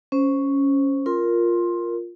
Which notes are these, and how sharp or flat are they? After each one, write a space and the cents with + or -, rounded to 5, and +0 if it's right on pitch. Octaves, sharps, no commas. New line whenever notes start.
C#4 +0 C5 +0
F4 +0 A#4 +0 C6 +15